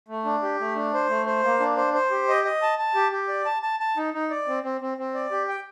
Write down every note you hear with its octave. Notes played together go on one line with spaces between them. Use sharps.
A3
D4
G4
A3
D4
C5
A3
C5
A#3
D4
C5
C5
G4
D#5
D#5
A5
A5
G4
G4
D5
A5
A5
A5
D#4
D#4
D5
C4
C4
C4
C4
D5
G4
G5